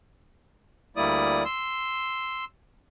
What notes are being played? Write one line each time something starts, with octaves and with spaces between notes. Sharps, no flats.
D2 G3 A#3 E4 D5 D#6
C6 E6